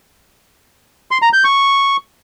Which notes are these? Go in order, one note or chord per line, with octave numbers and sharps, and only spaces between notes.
C6
A#5
G6
C#6